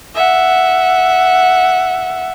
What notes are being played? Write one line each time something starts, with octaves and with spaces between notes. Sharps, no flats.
E5 F#5